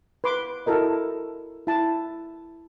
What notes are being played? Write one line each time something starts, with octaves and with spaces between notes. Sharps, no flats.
B4 C6 D6
E4 F#4 A4 A#4 D#5
E4 A5